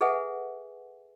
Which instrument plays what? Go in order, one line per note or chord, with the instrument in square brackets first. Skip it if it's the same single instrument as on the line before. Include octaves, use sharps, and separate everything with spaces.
[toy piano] G#4 A4 B4 E5 F#5 G#5